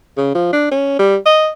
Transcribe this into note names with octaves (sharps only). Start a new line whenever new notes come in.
C#3
F3
D4
C#4
G3
D#5